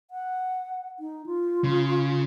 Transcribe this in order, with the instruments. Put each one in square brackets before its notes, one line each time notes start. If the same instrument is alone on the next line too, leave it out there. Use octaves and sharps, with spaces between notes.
[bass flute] F#5
D#4
F4
[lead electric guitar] C#3